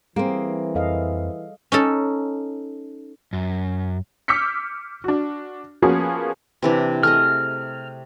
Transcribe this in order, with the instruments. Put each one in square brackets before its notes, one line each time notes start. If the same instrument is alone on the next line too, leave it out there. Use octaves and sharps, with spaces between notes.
[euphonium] E3 [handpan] G3 G#4 [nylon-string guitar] A#3 C4
[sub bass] F2 [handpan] A4 D#5 F5
[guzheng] C#4 D#4 A4
[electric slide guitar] F#2
[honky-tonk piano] D6 E6 F6 G6 B6 C#7
D4 F#4
F3 A#3 B3 C#4 F#4 G#4
[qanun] C3 E3 D4
[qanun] A3 G#4 D#5 [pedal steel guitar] F6